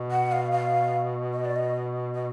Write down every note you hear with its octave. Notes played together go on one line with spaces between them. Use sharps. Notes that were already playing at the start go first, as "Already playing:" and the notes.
Already playing: B2
F#5
F5
F5
D#5
D5
D#5
D#5